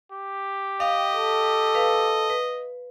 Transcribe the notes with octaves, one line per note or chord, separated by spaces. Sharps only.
G4
D#5 F5 G5
A4
B4 F5
B4